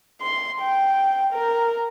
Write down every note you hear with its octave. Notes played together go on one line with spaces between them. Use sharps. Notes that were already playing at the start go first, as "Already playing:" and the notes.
C6
G5
A#4